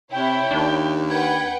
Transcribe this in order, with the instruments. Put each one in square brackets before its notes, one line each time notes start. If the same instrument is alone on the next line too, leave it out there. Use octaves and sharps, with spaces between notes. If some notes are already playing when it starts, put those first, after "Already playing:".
[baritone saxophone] C3 [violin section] E4 C#5 [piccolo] G5
[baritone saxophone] D#2 [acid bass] D4
[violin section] B4 F#5 G5 [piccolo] G#6